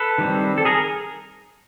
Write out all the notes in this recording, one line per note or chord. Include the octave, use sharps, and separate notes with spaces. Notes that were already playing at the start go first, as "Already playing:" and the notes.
Already playing: A4 B4
D#3 G3 C4
A4
G#4 A#4